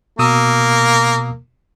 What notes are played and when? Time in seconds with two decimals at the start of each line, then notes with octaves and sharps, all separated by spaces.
0.19 B2 A#3 D#6 E6